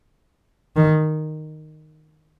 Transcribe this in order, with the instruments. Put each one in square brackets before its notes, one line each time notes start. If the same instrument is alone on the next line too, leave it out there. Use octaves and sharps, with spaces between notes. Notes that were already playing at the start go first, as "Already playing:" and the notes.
[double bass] D#3